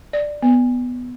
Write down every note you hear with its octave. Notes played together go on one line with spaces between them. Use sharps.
D5
B3